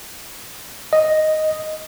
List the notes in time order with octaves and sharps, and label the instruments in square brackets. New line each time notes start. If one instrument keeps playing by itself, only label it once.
[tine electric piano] D#5